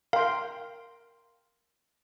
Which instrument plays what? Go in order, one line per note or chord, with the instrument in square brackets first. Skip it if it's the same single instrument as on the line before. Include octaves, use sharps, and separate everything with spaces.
[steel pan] A#4 G5 C6 [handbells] F5